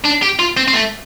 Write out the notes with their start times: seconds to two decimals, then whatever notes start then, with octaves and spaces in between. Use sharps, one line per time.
0.04 D4
0.22 G4
0.39 F4
0.57 C4
0.68 C4
0.74 A3